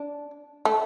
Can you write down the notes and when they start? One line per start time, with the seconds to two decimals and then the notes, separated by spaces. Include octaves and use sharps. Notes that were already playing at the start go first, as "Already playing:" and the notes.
Already playing: D4
0.65 A3